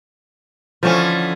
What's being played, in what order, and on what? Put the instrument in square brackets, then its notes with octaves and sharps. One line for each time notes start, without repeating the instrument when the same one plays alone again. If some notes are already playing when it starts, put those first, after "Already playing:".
[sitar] D3 E3 A3 [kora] F3 C#4